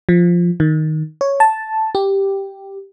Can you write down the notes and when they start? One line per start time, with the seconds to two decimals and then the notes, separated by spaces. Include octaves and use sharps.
0.09 F3
0.60 D#3
1.21 C#5
1.40 A5
1.95 G4